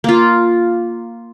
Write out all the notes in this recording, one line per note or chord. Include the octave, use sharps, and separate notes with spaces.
A#3 F4